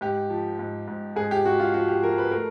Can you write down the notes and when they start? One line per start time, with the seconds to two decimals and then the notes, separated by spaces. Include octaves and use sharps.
0.01 G#2 G4
0.30 F3
0.59 G#2
0.88 G#2
1.16 G#2 G#4
1.31 G4
1.45 G#2 F#4
1.60 F4
1.74 F3 F#4
1.88 G4
2.03 F3 A#4
2.18 B4
2.31 A3 A#4